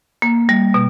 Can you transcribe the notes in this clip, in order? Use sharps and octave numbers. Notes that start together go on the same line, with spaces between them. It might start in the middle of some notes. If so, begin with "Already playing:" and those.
A#3
G3
B2